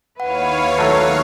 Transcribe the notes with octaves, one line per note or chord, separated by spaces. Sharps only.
D#2 E4 B4 C#5 F5 F#5
F#3 A3